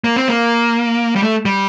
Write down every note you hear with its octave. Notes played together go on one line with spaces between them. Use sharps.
A#3
C4
A#3
G3
A3
G3